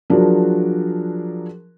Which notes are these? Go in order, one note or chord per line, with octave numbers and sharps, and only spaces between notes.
F3 F#3 D4 F#4 G#4 A#4